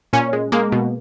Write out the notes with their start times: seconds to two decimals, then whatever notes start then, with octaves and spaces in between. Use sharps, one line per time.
0.13 A#2 C#4
0.33 G#3
0.52 G#3 A#3
0.72 B2